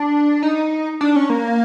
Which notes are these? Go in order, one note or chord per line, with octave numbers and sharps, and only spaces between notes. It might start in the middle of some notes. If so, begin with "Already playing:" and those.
Already playing: D4
D#4
D4
C#4
A#3